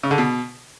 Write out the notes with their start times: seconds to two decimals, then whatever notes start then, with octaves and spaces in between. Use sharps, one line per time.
0.03 C#3
0.11 D3
0.18 B2